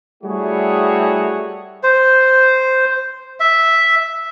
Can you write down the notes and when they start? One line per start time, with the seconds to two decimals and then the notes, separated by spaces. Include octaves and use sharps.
0.23 G3 A3 E4 F#4 G#4 C#5
1.83 C5
3.40 E5